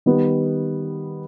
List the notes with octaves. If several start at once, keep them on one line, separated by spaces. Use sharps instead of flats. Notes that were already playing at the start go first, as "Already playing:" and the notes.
D#3 G3 B3